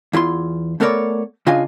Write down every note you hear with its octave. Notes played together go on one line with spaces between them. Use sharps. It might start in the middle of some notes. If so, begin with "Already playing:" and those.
E2 E4 F4 C6
A3 B3 A4 A#4 C#5 D5
C#3 D4 F4 D#5 F5 G#5